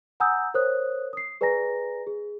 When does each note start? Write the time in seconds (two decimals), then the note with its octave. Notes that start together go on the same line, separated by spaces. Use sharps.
0.20 F#5 G#5 A#5 D#6 E6 G6
0.54 A#4 C5 C#5 D#6 F#6
1.13 D#6 C7
1.41 G#4 B4 D5 G#5 A#5 A#6
2.07 G#4